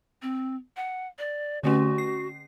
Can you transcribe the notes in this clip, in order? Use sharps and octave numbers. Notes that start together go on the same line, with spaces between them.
C4
F#5
D5
D3 A3 C#4 F#4
C7